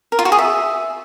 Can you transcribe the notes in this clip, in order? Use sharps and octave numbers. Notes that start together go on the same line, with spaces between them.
A#4
F4
F#4
G#4
E5